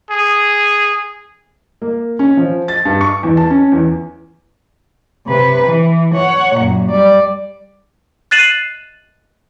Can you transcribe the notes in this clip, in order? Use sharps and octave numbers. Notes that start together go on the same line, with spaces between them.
G#4
A#3
C#4
F3
A6
G2
C#6
E2
A5
C#4
E2
C3 B4
E3
C#5 F#5
F#2 A#2
G3 D5
F#6 A6 C7 D#7 E7 F#7